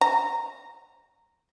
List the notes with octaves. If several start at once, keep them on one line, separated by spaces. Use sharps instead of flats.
A#5